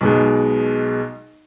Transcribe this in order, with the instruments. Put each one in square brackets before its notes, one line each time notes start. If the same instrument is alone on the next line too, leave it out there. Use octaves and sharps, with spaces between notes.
[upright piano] B1 B2 G#3